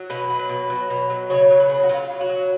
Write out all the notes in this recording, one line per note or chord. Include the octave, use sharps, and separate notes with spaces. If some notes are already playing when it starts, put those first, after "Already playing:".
Already playing: F#3
B2 B4
F#3
B4
B2
F#3
B2
F#3
C#3 C#5
F#3
B4
C#3
F#4
F#3 F4
C#3
F#4
F#3